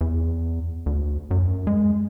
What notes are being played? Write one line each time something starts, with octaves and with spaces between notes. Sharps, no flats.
E2
D2
F#2
G#3